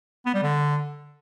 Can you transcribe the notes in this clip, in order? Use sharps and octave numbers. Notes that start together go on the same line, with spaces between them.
B3
G3
D3